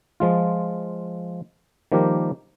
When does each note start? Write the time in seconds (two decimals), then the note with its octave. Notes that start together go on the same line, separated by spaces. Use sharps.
0.20 F3 G#3 F4
1.92 D#3 F3 G3 A#3 G4 A#4